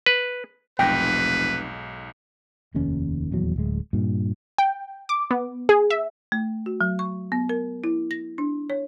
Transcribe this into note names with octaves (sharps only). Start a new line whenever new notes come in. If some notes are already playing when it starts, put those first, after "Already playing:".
B4
F1 B1 G#2 B4 G5 A#6
F1 D#2 D#3 C#4
D#1 E2 F#3
D1 G#3
G2 A#2
G5
D6
B3
G#4
E5
A3
F#4
F#3
C#6
B3
A#4
E4
A#6
D4
C#5